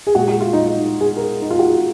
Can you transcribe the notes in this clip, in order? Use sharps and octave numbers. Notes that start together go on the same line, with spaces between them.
G#4
A#2 G#3 F#4
F#4
F4
D#4
D#4
G#4
A#4
D#4
F4
F#4
G#4